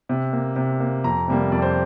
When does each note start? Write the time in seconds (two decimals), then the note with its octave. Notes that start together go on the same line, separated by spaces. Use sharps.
0.09 C3
0.33 A#3
0.56 C3
0.80 A#3
1.04 F2 A#5
1.28 C3 G3 A#3
1.52 F2 D5
1.62 C5